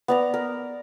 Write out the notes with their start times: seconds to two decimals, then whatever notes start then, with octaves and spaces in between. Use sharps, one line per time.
0.08 B3 D5 A#5
0.34 A#4